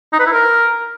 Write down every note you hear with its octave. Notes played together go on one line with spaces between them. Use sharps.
D#4
B4
E4
A#4